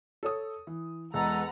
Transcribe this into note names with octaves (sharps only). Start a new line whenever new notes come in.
A4 C#5 D#6
E3
E2 G#3 A4 B4 F#5 A#5